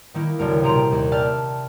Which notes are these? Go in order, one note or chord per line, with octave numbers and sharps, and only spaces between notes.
D#3 A#3 E4
F#1 D2 A#4
D#1 C3 G5 A#5 C6 D7
D#2
D5 E5 G5 A5 E6 F6